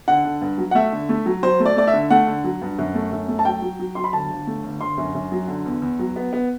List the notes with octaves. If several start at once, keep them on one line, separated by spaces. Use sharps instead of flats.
D3 F#5
D3
G2
F#3
F#5
A3 E5
D3
A3
F#3
F#3 C5
A3
D5
A3 D5
E5
D3
A3 F#5
D3
F#3
G2
F#2
A3
F#2
A3
A5
F#3 G5
F#3
F#3
F#3 C6
B5
G1 A5
G1
A3
G1
G1 C6
F#2
F#2
F#3
D3
E2
E2
F#3
B3
B3